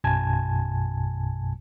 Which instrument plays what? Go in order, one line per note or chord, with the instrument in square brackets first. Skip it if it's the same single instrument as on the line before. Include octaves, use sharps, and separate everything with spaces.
[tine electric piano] A#1 F#2 B2 G#5 A5 G#6